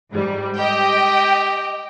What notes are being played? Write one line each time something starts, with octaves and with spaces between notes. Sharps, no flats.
G#2 G3
G4 D#5 G5